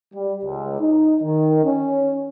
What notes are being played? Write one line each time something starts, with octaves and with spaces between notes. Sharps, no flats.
G3
C#2
D#4
D#3
C#4